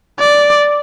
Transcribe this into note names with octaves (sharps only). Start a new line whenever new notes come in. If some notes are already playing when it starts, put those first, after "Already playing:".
D5